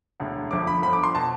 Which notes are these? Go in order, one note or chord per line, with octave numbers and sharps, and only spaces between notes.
E1 D2 D3
G1 F2 D3 F3 D6
B5
G1 F2 D3 F3 B5
D6
C6
B2 A5